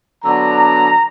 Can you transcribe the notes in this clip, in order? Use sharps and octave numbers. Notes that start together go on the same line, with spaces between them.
D3 F#3 B3 D4 A#5